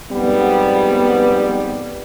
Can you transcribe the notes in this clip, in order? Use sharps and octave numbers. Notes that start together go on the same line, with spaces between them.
F2 G#2 G3 B3